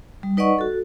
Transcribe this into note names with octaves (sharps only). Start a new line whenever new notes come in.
G3
D#4 B4 D5 D#5 F#5 C#6
F#4 A4